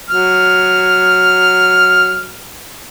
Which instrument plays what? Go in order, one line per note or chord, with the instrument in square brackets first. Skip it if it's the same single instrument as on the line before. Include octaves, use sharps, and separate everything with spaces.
[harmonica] F#3 F6